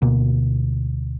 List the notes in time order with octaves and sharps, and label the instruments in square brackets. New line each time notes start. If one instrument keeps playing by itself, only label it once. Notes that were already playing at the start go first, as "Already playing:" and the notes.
[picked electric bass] D2 B2 A#3